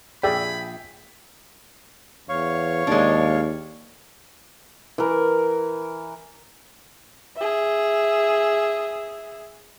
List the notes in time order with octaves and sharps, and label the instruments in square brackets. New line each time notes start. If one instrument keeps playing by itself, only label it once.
[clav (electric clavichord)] A#1 E5 [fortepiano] G#4 D5 [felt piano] G5 [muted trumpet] B5
[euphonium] E2 [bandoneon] C#5 F5 C#6
[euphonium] D#2 [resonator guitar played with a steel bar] G#3 D4
[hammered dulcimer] E3 A#4
[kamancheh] G#4 E5